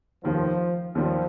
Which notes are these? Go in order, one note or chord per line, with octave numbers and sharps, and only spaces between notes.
F1 D#2 D#3 F3
D#2 D#3 F3 G3